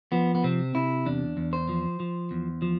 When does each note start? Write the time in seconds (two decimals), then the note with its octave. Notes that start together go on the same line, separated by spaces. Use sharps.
0.12 F3 B3
0.35 B3
0.44 C3 C4
0.75 C3 E4
1.06 E2 D4
1.37 E2
1.53 C5
1.69 F3
2.00 F3
2.31 E2
2.62 F3